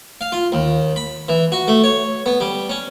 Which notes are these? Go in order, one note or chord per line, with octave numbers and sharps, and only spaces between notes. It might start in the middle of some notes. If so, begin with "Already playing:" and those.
F5
F4
D#2
B5
E3
F#4
A3
C#5
B3
G3
C#4